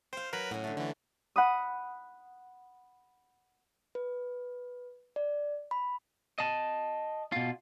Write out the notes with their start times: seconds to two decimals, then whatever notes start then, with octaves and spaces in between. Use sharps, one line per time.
0.13 C5 F5 G5
0.33 F#3 A#4 B4 B5
0.51 A2 C#4 F#4
0.64 D3 A3
0.77 D3 E3 A3
1.36 F#5 B5 D#6
3.95 B4
5.16 D5
5.71 B5
6.38 D#5 A5
7.32 B2 F4